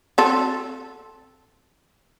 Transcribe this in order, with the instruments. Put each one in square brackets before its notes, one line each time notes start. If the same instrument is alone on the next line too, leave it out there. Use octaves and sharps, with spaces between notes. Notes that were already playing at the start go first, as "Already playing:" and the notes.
[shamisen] C4 F#4 A4